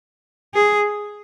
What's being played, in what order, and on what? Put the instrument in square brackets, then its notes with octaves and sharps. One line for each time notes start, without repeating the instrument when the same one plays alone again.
[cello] G#4